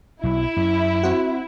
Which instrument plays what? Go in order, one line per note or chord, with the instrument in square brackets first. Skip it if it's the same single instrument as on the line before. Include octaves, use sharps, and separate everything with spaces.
[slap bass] B1 F#3 [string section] E4
[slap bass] F#2
[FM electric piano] C4 F#4